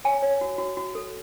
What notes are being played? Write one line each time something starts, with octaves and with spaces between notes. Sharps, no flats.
C#5 G#5
C#5
F#4
F#4
F#4
A4